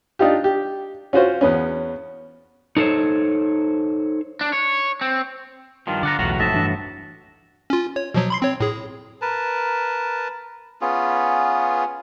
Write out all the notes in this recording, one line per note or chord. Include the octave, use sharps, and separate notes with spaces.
D4 D#4 F4 G4
G4
C#4 F4 F#4 C5
E2 B3 C#4
D#4 A4 A#4 C5 C#5
D4
C#5
C4
G2 D#3 F3 F4
D3 D5 F#5 A#5
B1 E2 A2 F#4 A#5
F1 F2 G#2 D#5 E5 A5
G2 E3 D4
C#4 F4
C#5
B2 F3 F#3
B5 C6 C7
C4 C#5
A2 G#4
A#4 B4 A5
B3 C#4 F4 G#4